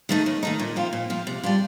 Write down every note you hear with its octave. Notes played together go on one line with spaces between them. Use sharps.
D#3 A3 D#4
D#2
D#3 A3 D#4
A#2
F3 C4 F4
A#2
F3 C4 F4
C3
G3 D4 F4